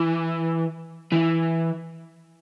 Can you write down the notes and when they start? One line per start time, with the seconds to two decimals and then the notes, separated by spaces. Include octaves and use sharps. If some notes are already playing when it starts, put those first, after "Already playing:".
Already playing: E3
1.12 E3